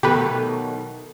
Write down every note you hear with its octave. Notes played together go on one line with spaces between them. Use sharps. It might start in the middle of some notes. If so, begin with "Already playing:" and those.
B2 D#3 F#3 A3 G4 B4